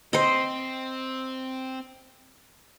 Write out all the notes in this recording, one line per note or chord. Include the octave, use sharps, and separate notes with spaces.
C4 C5 D#5